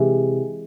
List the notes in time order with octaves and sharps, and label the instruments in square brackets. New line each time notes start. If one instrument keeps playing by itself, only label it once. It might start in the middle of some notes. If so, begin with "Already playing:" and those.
Already playing: [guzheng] C3 E3 G#3